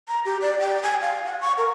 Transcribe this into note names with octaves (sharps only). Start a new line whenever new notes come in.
A#5
G4
D5
G5
G#5
F5
F#5
C#6
A#4